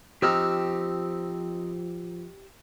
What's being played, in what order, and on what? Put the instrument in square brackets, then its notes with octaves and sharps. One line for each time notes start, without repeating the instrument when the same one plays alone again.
[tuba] F3 [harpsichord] C4 D#4 [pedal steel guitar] G4 E6 F6